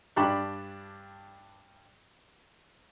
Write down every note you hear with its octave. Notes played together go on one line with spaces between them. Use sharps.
G2 D4 G4 B5 C#6